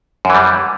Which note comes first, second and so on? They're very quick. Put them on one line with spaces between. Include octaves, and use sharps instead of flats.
F#2 E3 G3